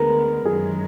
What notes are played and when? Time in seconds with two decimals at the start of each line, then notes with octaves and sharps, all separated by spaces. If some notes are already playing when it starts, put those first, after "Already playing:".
Already playing: D2 D3 G#3 B3 A#4
0.45 F#2 D#3 G#3 G#4